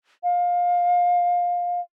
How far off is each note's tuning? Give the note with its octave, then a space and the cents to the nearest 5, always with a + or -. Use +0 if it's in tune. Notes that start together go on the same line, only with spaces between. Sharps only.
F5 +20